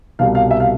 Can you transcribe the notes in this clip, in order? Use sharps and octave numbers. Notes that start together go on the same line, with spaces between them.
C2 B2 F5
F5
E5
F5